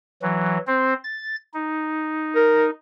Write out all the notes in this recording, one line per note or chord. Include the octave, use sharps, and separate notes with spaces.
E3 F#3
C4 C5
A6
D#4
A#4